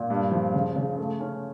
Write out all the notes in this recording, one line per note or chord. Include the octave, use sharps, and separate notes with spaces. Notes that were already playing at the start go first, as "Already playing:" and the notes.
Already playing: A#2
G2
F3
C#3
C#3
A3
C#4